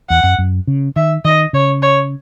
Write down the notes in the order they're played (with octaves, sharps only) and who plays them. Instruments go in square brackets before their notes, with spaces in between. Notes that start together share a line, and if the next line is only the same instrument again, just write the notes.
[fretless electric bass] E2 [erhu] F#5
[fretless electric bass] F#2
F#2
C#3
[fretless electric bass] D#3 [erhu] E5
[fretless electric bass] D#3 [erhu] D#5
[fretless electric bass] C#3 [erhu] C#5
[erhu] C#5